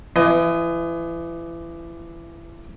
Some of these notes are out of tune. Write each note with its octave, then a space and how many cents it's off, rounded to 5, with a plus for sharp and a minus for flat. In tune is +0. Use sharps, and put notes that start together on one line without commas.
E3 +30 D#5 -5